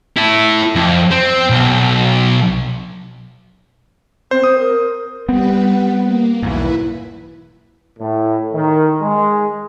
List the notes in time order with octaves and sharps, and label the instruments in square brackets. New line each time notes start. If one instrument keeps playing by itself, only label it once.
[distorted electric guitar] E4 A4
F2
C4
B1
[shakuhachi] C4 [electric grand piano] C5
[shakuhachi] C5 [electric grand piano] D#6
[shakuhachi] A#4
[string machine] G3 B4 [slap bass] B3 C4
[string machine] A#3
[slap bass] B1 E2 G#2 [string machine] E4 B4
[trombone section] A2
D#3
G#3